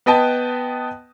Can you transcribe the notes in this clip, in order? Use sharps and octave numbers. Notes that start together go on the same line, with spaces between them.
B3 B4 D#5 G5 A5